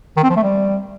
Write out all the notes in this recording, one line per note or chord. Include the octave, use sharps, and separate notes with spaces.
D#3
C4
F3
A3
G3